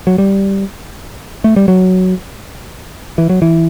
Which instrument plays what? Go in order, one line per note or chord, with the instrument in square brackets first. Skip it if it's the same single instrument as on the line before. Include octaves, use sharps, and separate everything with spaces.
[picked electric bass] F#3
G3
A3
G3
F#3
E3
F#3
E3